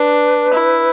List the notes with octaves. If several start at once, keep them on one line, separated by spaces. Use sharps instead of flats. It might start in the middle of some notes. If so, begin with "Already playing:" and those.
Already playing: D4 B4
E4